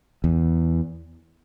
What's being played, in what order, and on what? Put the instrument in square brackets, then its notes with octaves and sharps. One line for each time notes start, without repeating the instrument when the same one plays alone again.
[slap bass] E2